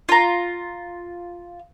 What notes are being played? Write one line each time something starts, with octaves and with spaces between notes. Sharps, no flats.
F4 A#5